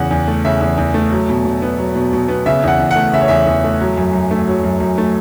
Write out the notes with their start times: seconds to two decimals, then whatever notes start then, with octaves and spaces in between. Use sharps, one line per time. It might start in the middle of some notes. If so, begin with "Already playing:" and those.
Already playing: E2 C#3 F#5
0.11 E2
0.27 A3
0.45 C#3 E5
0.61 E2
0.77 E2
0.94 A3
1.11 F#3
1.29 B2
1.45 B2
1.62 B3
1.78 F#3
1.95 B2
2.13 B2
2.28 B3
2.46 C#3 E5
2.63 E2 F#5
2.80 E2
2.91 F#5
2.96 A3
3.13 C#3 E5
3.21 C#5
3.28 E2 E5
3.46 E2
3.64 A3
3.81 F#3
3.97 F#2
4.13 F#2
4.31 A3
4.48 F#3
4.63 F#2
4.80 F#2
4.98 A3